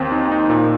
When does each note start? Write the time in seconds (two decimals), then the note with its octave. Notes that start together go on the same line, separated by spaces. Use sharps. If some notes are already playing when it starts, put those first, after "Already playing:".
Already playing: D#2 C4
0.12 D#4
0.32 D#4
0.50 A#2